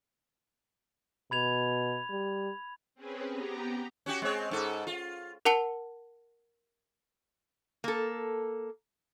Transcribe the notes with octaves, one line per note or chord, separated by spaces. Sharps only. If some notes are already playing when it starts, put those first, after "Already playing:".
B2 B5 G#6 F7
G3
C4 C#4 G#4 B4
B3 G4 A#5
C#4 F#4 G4
G#3 C4 C#5
G#2 A4
F4
A#4 F#5 A5 C#7 G7
A#3 A4